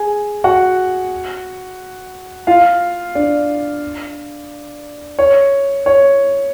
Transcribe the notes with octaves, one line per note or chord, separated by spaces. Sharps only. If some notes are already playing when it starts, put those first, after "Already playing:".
Already playing: G#4 G#5
F#4 F#5
F4 F5
D4 D5
C#5
C#5